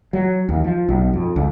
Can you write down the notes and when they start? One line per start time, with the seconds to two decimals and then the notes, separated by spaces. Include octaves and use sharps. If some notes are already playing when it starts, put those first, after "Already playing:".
0.13 F#3
0.49 D#2
0.64 F3
0.88 B1
1.13 F2
1.36 C#2